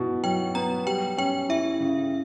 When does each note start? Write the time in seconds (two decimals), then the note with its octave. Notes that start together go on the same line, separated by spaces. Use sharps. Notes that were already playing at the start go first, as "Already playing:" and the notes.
Already playing: B2 E4
0.23 F#3 G5
0.55 B3 A#5
0.86 G3 G5
1.18 C#4 G5
1.49 E4 E5
1.80 C#3